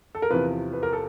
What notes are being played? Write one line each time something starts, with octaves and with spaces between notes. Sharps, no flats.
A4
A#4
E2 C3 F3 B4
B4
A#4
A4